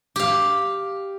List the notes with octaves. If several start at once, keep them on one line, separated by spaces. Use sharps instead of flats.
G4 F5